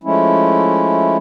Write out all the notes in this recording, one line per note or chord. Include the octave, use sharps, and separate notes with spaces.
F3 G#3 A3 C#4 E4